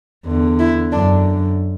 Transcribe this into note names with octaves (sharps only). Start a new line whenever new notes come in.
E2 D3
E4
F#2 D3 D4